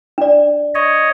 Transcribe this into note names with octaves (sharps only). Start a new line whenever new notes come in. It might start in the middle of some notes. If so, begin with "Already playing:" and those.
D4 D5
C#5 D#5